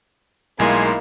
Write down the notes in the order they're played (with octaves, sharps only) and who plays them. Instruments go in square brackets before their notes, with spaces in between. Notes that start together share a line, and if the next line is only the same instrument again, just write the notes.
[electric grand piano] B1 G#3 C6 [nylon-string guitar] G3 D#4 E4 [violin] A#3 [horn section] G#5